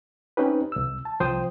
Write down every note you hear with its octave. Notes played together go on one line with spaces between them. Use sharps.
C4 C#4 D#4 G4 B4
C2 E6
A5
C2 F3 C5 G5 D#6